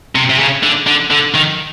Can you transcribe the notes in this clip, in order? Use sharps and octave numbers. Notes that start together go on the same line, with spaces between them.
C3
C3
C#3
D3
D3
D3
D#3